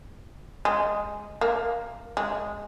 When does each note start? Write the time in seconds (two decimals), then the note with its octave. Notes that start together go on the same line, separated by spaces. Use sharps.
0.65 G#3
1.41 A#3
2.17 G#3